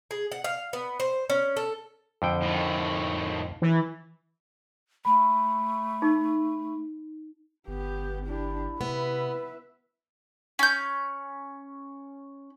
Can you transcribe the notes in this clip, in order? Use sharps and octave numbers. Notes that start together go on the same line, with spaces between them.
G#4
F#5
F5
B3
C5
C#4
A4
F2 D3 G5
A2 D#3
E3
A3 B5
D#4
G1 B3 G4
D4 E4 G4
C3 B3 B4 E5
C#4 G6